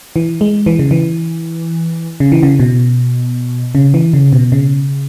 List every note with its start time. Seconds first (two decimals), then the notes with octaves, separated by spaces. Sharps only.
0.16 E3
0.41 G#3
0.66 E3
0.79 C#3
0.91 E3
2.20 C#3
2.32 E3
2.43 C#3
2.60 B2
3.75 C#3
3.94 E3
4.13 C#3
4.33 B2
4.52 C#3